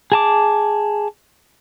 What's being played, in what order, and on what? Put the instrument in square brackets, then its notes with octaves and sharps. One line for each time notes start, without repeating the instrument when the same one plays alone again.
[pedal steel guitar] G#4 A5 D6